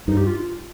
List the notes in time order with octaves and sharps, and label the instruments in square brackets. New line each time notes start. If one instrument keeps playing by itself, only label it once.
[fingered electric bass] G2 [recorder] D#4
[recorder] G4
F4